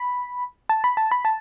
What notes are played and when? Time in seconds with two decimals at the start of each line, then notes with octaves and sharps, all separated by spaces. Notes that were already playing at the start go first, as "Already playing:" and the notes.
Already playing: B5
0.69 A5
0.84 B5
0.97 A5
1.11 B5
1.25 A5